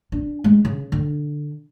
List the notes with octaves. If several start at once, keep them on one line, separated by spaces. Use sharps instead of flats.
D4
G#3
C#3
D3